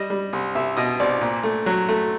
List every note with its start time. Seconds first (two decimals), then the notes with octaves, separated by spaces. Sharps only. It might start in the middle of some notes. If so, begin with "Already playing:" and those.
Already playing: G3 D#5
0.10 G3
0.33 C2
0.55 C2 E5
0.77 B2 D#5
1.00 C2 D5
1.21 A#2
1.43 A3
1.66 F#3
1.89 A3